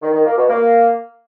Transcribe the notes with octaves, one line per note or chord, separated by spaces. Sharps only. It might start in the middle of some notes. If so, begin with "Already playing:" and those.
D#3
D#3
A#3
B2
A#3